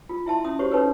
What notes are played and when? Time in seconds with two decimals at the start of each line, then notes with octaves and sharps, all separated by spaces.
0.09 F4
0.26 E4 E5 A5 C6
0.44 C#4 E5 D#6
0.59 F#4 G4 C5 C#5 C#6
0.71 C#4 D#4 A4 B4 C#5 E6